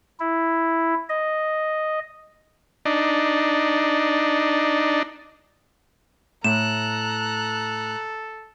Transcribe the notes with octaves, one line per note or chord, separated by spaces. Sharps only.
E4
D#5
D4 D#4
A2 A4 A#5 F#6 E7